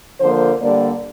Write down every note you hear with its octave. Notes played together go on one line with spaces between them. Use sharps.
D3 F3 A#3 C5
D3 G3 A#3 D5